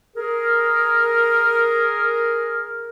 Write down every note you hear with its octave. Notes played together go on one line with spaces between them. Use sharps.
G#4 A#4